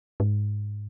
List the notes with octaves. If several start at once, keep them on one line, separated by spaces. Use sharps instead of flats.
G#2